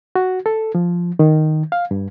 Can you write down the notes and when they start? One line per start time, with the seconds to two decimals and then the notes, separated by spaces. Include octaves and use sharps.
0.15 F#4
0.46 A4
0.75 F3
1.19 D#3
1.72 F5
1.91 G2